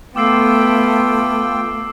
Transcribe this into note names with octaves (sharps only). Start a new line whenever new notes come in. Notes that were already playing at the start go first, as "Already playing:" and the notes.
A3 B3 F4 G5 D6 E6 C7